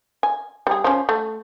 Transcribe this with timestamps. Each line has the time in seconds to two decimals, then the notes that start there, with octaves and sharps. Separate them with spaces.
0.23 G#5
0.67 G3 G#4
0.84 F3 C#4
1.09 A3